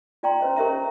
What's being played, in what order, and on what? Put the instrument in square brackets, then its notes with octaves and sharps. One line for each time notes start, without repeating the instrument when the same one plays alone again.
[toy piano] F4 D5 G5 A#5 C6
C#4 B4 C5 D#5
G4 A#4 C#5 E5 A#5
C#4